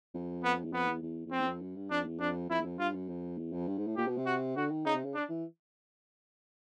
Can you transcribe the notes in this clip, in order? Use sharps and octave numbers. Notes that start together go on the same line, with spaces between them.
F2
B3
E2
F2 B3
E2
E2
E2
F2 C4
E2
F2
F#2
G2
F2 D4
E2
F2 D4
F2 E4
E2
F2
G2 F4
F#2
F2
E2
F2
G2
G#2
A2
A#2 G4
B2
C3
F#4
D3 F#4
D#3
C#3 D#4
C3
C#3
D4
E3